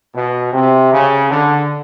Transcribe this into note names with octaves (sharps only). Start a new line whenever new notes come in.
B2
C3
C#3
D3